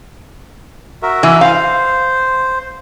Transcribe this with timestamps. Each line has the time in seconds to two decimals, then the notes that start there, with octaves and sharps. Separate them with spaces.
1.02 F#4 A#4 E5
1.23 E3
1.41 C5 F5